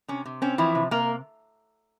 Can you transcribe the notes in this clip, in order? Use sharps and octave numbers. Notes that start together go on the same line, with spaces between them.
C3 C#4
C3
C4 C#4
E3 F3 E4
C3
C3 A#3 A#4